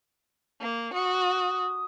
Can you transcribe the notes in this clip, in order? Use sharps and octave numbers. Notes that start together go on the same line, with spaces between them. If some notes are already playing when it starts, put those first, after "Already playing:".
A#3
F#4 D#6